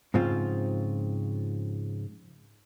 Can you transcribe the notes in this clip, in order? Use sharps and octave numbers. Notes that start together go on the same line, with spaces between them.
G#2 C#3 F3 C4 F4